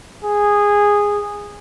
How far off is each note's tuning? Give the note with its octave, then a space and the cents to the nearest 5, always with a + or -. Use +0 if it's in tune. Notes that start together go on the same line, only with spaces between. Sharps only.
G#4 -15